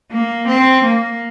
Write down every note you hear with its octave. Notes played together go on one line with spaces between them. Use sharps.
A#3
C4
A#3